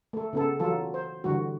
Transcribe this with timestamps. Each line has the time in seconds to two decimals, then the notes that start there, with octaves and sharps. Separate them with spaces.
0.13 A3 A4
0.33 C#3 B3 A4
0.59 E3 F#3 F4 A4
0.94 C5
1.24 D3 E3 G3 F#4